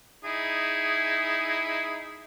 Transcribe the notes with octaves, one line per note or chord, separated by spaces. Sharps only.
D#4 E4 G#4